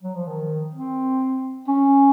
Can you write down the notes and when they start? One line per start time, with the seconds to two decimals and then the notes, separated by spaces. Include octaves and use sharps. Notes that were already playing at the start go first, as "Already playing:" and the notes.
0.03 F#3
0.15 F3
0.28 D#3
0.74 C4
1.68 C#4